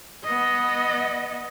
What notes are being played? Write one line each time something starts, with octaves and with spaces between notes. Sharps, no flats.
B3 D#5